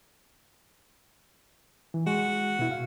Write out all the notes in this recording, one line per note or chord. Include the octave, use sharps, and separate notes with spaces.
E3
G#3 F#4
B2 E4
F5